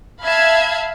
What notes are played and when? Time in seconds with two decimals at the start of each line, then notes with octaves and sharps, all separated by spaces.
0.23 E5 F5 A5 B5 G#6